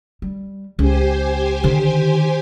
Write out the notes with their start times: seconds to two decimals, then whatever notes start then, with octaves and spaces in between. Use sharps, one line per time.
0.22 G3
0.79 C#2 G4 C5 G#5
1.64 D3 D#3